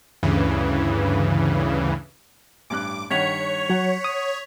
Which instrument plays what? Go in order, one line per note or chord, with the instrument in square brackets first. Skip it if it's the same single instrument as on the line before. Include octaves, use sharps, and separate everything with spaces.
[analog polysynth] D2 G2 C#3 E3
[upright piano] A1 G2 F#6 [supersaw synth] D6
[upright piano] G2 D#3 F#5 [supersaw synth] C#5 [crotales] G#6 B6 F7
[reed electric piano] F#3 [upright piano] F#5
[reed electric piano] D#6